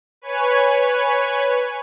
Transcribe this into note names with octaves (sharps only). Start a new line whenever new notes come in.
B4 C#5 G#5